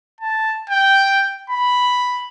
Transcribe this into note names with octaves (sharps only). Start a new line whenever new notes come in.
A5
G5
B5